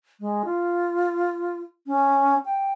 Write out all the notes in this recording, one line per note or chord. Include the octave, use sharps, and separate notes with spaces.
G#3
F4
C#4
G5